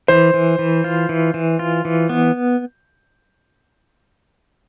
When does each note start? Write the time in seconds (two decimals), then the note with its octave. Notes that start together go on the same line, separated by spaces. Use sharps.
0.08 E3 C5
0.34 E3
0.59 E3
0.84 F4
1.09 E3
1.34 E3
1.59 F4
1.85 E3
2.09 B3